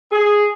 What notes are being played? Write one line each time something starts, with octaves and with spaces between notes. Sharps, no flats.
G#4